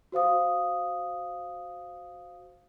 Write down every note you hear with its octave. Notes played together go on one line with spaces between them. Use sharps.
F#4 C5 F5 D#6